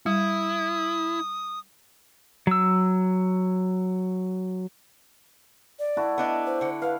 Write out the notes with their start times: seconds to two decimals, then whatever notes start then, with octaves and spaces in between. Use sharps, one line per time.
0.06 G3 E4 D#6
2.47 F#3 E6
5.79 D5
5.97 E4 F#4 A4
6.18 B3 D4 D#5
6.46 C5
6.61 D3 F#5
6.82 B4 F5